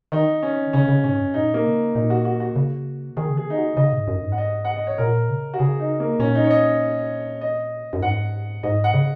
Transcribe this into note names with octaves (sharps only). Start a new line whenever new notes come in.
D#3 D#4
C#4
C#3 C#4
C#3
G#2 C#4
F#2
A#2 D#4
A#3
C#3
A#2 D#4
F#4
F#4
F#4
C#3
D#3 G#4
C#3
G#4
D#3
D#4
F#4
C#3 D#5
G#2
F#2
G#2
F#5
D#5
F#5
D#5
C#5
A#2 A#4
C#3
F#4
C#3 G#4
D#4
A#3
A#2 C#4
D#4
C#5
D#5
D#5
F#2
G#2 F#5
G#2 D#5
F#5
C#3